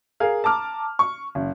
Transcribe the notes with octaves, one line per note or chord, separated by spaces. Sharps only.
G#4 A#4 F5
A5 A#5 D6 F6
C#6
F#1